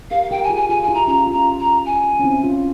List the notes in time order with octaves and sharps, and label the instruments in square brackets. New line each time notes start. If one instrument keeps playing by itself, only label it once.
[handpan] G4 A#4 [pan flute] F5
[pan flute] F5
[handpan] G4 A#4 [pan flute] G5
[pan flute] G#5
[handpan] F4 G#4
[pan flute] G#5
[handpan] F4 G#4 [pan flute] G#5
[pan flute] G#5
[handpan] E4 G4
[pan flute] A#5
[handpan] C#4 F4 [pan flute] A#5
[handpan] C#4 F4
[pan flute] A#5
A#5
G#5
[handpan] C#4
C4 E4
C#4 F4